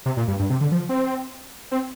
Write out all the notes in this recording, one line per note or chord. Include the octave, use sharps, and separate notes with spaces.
C3
A#2
G2
G2
C3
D3
F3
C4
C4